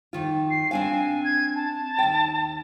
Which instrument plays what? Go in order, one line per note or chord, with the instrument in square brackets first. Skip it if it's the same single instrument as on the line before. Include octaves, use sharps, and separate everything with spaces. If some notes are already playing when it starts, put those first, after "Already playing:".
[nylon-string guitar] F2 D#3 F4
[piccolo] C7
[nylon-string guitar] C4 D4 F5 [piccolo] G#5
[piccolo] G#6
A5
[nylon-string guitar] D#2 G5